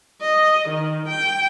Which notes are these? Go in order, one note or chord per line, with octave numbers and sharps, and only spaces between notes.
D#5
D#3
G5